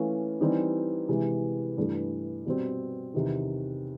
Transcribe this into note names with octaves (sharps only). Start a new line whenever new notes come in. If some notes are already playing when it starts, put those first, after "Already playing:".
Already playing: E3 A3 C#4 F4
E3 G3 C4 D#4 G4
C3 E3 G#3
G2 E3 A3
B2 G3 C4
E2 C3 D#3